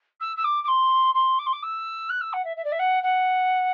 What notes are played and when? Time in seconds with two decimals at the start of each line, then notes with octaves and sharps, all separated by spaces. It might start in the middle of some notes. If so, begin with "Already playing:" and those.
0.20 E6
0.36 E6
0.44 D6
0.63 D6
0.68 C6
1.14 C6
1.38 D6
1.46 C6
1.52 D6
1.62 E6
2.09 F#6
2.21 E6
2.33 F#5
2.44 E5
2.56 E5
2.64 D5
2.72 E5
2.79 F#5
3.03 F#5